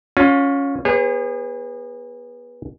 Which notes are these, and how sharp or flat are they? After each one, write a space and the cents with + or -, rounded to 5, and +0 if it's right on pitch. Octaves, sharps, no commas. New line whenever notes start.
C#4 +0 F4 +30
B3 -25 G#4 -35 C5 +45